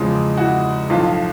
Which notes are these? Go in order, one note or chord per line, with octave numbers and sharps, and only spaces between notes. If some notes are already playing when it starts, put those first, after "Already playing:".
Already playing: E2 C#3 F3 G#3
E4 F#4
B1 A2 F3 F4